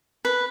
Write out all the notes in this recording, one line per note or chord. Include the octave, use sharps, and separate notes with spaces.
B4